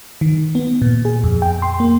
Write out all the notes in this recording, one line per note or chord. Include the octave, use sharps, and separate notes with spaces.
D#3
B3
A#2
G#4
F2
G5
C6
A#3